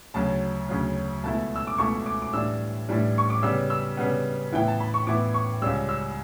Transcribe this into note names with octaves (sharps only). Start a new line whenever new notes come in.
D2 C#3 F#3 A5
D2 C#3 F#3
C#2 B2 A3 E4 A5
E6
D6
C#2 B2 A3 E4 C#6
D6
D6
A2 E3 G3 D4 E6
A2 E3 G3 D4
C#6
D6
C#3 G3 B3 E6
E6
C#3 G3 B3
A2 E3 B3 E4 G5
A5
B5
C#6
A2 E3 B3 E4 D6
C#6
C#2 C#3 G3 E6
E6